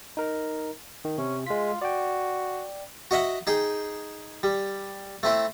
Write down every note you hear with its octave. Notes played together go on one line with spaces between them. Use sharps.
D#4 A#4 A#5
D#3
C3 C#4
G#3 F4 B6
F#4 D5 G5
F#4 D#5 E5 F#5
D#4 G#4 G5
G3
A3 C4 E4